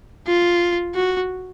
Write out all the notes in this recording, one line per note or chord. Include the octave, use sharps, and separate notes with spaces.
F4
F#4